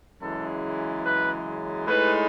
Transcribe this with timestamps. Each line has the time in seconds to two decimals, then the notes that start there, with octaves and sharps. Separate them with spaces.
0.21 F#2 C#3 E3 G#3 A4
1.04 B4
1.87 A2 G#3 D#4 B4